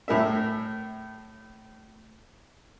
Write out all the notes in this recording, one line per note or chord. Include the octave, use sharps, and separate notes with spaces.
A2 A#4 E5